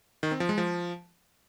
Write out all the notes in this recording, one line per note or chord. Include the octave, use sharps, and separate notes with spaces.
D#3
C4
F3
G#3
F3